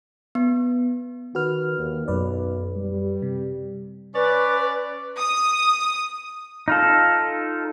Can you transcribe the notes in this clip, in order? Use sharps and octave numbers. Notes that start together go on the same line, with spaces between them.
B3
D#3 F#4 B4 F6
D#2
B1 F#2 B4 D5
G3
C3
C#4 B4 C#5 D5
D#6
D#4 F4 A4